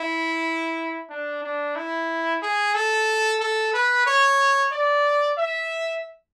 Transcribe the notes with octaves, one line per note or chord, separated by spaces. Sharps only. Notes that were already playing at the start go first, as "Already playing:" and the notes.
Already playing: E4
D4
D4
E4
G#4
A4
A4
B4
C#5
D5
E5